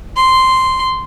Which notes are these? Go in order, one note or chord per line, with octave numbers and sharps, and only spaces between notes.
C6